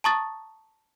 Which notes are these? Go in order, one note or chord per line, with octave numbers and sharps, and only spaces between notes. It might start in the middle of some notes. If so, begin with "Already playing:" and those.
A5 A#5 C#6 D#6 A6